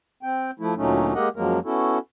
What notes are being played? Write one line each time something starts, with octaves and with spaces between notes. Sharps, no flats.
C4 G5
F3 A3 E4
D2 A#2 F#3 A3 C#4 D#4
G#3 A#3 G4 A#4 D#5 F#5
F#2 F3 F#3 G#3 A#3 A#4
B3 C#4 E4 F#4 A4